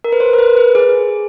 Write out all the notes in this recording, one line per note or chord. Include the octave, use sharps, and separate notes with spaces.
A#4
B4
C5
A#4
B4
B4
G#4